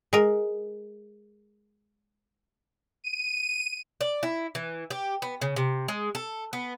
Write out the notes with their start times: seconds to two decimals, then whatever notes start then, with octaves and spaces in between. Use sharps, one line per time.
0.13 G#3 A#4
3.04 D#7
4.01 D5
4.23 E4
4.55 E3
4.90 G4
5.22 B3
5.41 C#3
5.56 C3
5.88 G#3
6.15 A4
6.53 B3